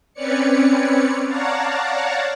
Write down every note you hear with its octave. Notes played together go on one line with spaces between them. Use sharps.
C4 C#4 B4 C#5 D5 C#7
C#5 D5 F5 F#5 A5 A#5